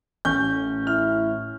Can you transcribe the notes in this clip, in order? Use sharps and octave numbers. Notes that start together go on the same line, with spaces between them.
A1 C#4 G6
E4 F6